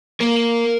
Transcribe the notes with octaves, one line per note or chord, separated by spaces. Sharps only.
A#3 A#4